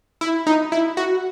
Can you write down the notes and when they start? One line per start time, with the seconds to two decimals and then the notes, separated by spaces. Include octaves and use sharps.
0.21 E4
0.47 D#4
0.72 E4
0.97 F#4